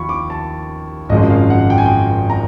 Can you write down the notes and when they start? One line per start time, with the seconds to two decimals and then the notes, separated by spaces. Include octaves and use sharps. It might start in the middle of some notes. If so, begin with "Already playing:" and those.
Already playing: D#2 F3 B5 C#6
0.09 D6
0.30 A5
1.09 G#1 F#2 C#3 F3 G#3 D#5
1.30 F5
1.50 F#5
1.70 G5
1.78 G#5
1.86 G5
2.30 A#5